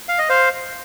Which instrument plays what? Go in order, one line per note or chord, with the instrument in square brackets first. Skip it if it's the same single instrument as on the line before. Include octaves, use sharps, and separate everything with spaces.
[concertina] F5
D#5
C5 F5